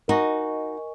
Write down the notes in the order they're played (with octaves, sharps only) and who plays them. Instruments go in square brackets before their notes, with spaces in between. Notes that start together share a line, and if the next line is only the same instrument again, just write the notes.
[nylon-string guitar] D#4 F#4 [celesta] A#4 D#5 G#5 C#6